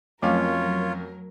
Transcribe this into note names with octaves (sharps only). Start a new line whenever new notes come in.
F2 F#3 A3 C#4 F4 A#4 C#5 F5